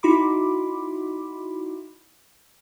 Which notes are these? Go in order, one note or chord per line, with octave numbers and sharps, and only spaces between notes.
D#4 E4 F#4 B5 C6 D6